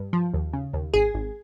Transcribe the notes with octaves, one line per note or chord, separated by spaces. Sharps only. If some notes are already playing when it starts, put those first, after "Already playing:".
Already playing: G2
F3
D#2
C#3
D#2
G#1 G#4
G#1